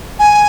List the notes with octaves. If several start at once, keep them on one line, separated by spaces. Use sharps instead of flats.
G#5